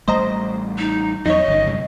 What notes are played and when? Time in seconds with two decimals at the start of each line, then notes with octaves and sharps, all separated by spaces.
0.08 A1 G3 A3 C5 D#5 A#5
0.78 D#4
1.26 E2 F#3 D#4 C#5 D#5
1.48 G1 C#3
1.67 F#2 C3 G#3